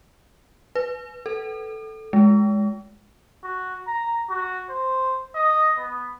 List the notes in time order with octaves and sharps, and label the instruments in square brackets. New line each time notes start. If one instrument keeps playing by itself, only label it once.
[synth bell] B4
A4
G#3
[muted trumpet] F#4
A#5
F#4
C5
D#5
B3